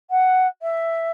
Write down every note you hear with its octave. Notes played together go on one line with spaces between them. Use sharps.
F#5
E5